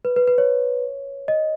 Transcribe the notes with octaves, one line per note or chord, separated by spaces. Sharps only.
B4
B4
B4
C#5
D#5